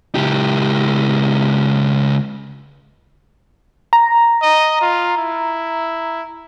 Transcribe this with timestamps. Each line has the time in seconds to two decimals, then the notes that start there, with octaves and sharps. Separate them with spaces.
0.15 C#2 G4
3.93 A#5
4.42 D#5
4.81 F4
5.17 E4